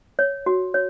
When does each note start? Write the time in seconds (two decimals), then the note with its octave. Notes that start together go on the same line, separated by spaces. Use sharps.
0.19 C#5
0.46 F#4
0.74 C#5